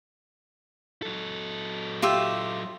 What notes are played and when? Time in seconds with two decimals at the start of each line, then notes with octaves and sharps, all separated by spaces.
1.02 F#3 A4
2.02 F4 G4 E5